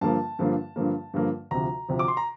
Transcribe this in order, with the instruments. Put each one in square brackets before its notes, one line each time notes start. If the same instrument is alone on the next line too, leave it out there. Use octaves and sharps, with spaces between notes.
[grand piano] G2 D3 F3 A#3 A5
G2 D3 F3 A#3
G2 D3 F3 A#3
G2 D3 F3 A#3
D2 C3 F3 A#5
D2 C3 F3
D6
C6
A#5